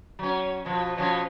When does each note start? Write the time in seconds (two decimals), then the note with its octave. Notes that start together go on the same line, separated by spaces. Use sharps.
0.19 F#3 C#4
0.65 B2 F3
0.97 B2 F3 C#4